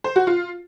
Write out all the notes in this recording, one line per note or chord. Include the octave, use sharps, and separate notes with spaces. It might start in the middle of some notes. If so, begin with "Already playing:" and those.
C5
F#4
F4